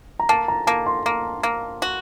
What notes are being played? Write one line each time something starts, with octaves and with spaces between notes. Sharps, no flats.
A#5
A#3 A5
A#5
A#3 A5
C6
A#3
A#3
F#4